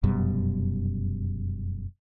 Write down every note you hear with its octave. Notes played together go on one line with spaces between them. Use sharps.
F1 F#2 B2 G3